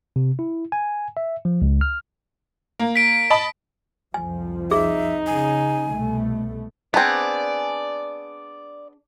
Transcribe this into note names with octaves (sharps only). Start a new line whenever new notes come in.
C3
E4
G#5
E5
F3
C#2
F6
A#3
B6 D7
D#5 A5 B5
C2 F2 F3 G#5
D#4 G#4 E5
C#3 G#5
C2 B2 A3
B3 C4 D4 G#4 D5